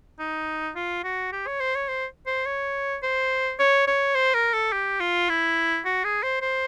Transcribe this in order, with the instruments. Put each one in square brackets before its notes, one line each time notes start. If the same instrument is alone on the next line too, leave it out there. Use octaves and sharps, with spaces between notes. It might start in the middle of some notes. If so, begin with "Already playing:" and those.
[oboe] D#4
F4
F#4
G4
C#5
C5
C#5
C5
C5
C#5
C5
C#5
C#5
C5
A#4
A4
G4
F4
E4
F#4
G#4
C5
C5